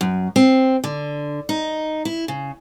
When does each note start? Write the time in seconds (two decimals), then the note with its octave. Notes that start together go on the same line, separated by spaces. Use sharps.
0.01 F#2
0.36 C4
0.84 D3
1.49 D#4
2.05 E4
2.28 C#3